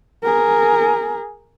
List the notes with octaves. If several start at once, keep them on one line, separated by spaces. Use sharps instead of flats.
G#4 A#4